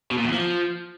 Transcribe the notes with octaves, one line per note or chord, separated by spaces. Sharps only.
B2
A#2
E2
F3